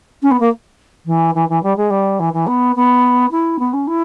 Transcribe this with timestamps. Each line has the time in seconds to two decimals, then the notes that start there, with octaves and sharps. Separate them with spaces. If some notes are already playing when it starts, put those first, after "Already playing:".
0.22 C#4
0.31 B3
0.40 A#3
1.06 E3
1.34 E3
1.49 E3
1.63 G3
1.76 G#3
1.90 G3
2.19 E3
2.33 E3
2.47 B3
2.75 B3
3.31 E4
3.59 B3
3.73 C#4
3.87 E4